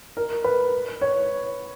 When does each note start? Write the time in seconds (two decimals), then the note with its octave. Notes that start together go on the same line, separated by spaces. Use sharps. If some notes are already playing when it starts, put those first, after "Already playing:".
0.17 A#4
0.44 B4
1.01 C#5